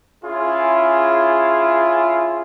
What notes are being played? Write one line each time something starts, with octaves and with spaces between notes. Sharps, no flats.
C#4 E4 F4 G#4